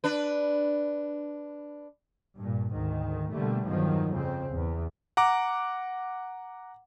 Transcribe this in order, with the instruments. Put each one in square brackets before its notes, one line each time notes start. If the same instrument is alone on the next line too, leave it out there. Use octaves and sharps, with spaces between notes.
[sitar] D4 B4
[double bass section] G2 A#2
D2 G#2 D#3
B2 D3 G3 A3 A#3
E2 G2 D#3 F3 F#3
F2 C#3 C4
E2
[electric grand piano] F#5 A#5 D6